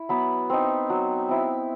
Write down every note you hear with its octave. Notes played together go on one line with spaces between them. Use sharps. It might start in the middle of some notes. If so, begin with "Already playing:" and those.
Already playing: E4
F#3 B3 B4
C4 D#4
F#3
C4 E4